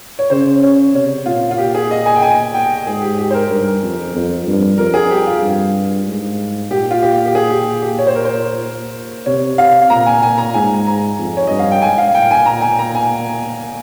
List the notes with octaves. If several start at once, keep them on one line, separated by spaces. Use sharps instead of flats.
C#5
C#3 C5
C#5
C3 C#5
A#2 F4
F4
G4
G#4
D#5
G#5
G5
G#5
G5
G#2 G#4
G4
G4
C5
A#4
G2 A#4
F2
F2
G2
F2 A#4
G#4
G4
F4
G2
G#2
A#2 G4
F4
G4
G4
G#4
G4
G4
C#5
C5
A#4
C5
C3 C#5
F5
A#2 A#5
G#5
G#5
A#5
G#2 G#5
A#5
F2
C#5
G2 D#5
F5
G5
G#2 G#5
F5
A#2 G5
G#5
A#2 A#5
G#5
A#5
G#5